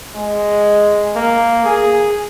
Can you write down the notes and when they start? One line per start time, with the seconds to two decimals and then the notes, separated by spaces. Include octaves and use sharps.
0.15 G#3
1.15 A#3
1.65 G#4